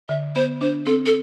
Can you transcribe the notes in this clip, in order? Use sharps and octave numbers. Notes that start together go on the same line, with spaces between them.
D3 E5
B3 C5
D4 C5
C4 A4
A4